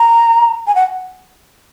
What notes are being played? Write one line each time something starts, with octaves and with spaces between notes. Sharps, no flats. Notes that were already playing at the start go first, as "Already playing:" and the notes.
Already playing: A#5
G#5
F#5